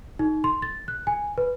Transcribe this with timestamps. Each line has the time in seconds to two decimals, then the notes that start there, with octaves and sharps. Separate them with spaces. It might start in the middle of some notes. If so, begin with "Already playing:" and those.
0.19 D#4
0.44 C6
0.62 A6
0.88 F#6
1.07 G#5
1.38 B4